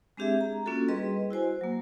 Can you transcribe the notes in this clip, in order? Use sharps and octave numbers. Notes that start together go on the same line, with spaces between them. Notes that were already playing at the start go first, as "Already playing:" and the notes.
G#3 C4 D4 G4 G#4 E5
A#5
A#3 C#4 D4 F4 F#4 A4
G3 G#4 B4 D#5 C6
E4 F#4 C5 G#5
F#3 A#3